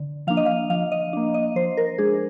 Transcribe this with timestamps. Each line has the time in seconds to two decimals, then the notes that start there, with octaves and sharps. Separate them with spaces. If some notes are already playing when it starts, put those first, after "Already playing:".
Already playing: D3
0.27 F3 A#3 D4 F5
0.37 D#5
0.46 F5
0.70 F3 F5
0.92 D#5
1.13 A#3 D4
1.34 D#5
1.56 F3 C5
1.77 A#4
1.98 G#3 D4 G#4